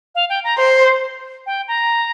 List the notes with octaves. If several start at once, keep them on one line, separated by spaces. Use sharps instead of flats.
F5
G5
A#5
C5
G5
A#5